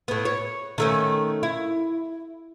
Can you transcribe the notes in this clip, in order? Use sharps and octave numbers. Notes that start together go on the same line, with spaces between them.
A2 B3
C#5
D#3 A3 C#4
E4